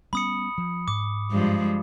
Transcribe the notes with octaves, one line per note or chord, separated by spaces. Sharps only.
G3 B3 C#4 B5 D#6 C#7
F3
G#2 D6
G2 F3 G#3